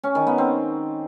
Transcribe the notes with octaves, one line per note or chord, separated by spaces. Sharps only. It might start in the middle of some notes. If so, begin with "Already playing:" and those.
C#4
D#3
B3
C4